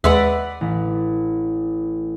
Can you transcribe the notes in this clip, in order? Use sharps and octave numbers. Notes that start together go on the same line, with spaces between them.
D#2 G#3 B4 D5 E5 F#5
A1